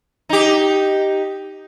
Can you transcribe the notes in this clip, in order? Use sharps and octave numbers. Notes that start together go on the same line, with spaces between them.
D#4 G4